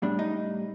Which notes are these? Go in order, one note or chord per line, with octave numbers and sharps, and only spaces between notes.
A2 G3 D4
D#4